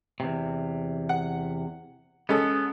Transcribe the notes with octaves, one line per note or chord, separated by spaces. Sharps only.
E2 C3
F#5
G#3 B3 C#4 A4